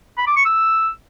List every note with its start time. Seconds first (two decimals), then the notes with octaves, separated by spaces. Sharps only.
0.18 B5
0.27 D6
0.36 C#6
0.46 E6